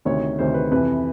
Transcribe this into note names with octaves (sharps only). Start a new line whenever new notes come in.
D2 C3 D#3 C#5
D2 C3 D#3 C5
B4
F2 C3 E3 B4